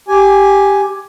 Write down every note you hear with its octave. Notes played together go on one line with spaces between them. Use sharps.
G4 G#5